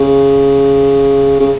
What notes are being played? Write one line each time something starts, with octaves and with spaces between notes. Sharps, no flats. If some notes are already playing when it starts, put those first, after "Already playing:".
Already playing: C#3
C#3